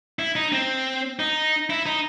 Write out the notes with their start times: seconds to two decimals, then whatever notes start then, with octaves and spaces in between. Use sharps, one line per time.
0.19 E4
0.36 D#4
0.52 C4
1.19 D#4
1.70 E4
1.86 D#4